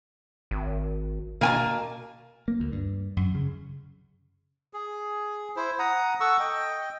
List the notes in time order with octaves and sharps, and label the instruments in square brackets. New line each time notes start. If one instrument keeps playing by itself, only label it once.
[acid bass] G#1
[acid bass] B2 [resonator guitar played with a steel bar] A#3 G#5 A5
[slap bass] A#3
D2
G2
F#2
C#3
[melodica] G#4
E4 C5
F#5 A#5 D#6
A4 F#5 C#6 E6
D#5 G5